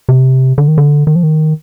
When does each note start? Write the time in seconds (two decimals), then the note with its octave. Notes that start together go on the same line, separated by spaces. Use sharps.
0.09 C3
0.58 D3
0.68 D#3
0.78 D3
1.07 D#3
1.16 F3
1.23 D#3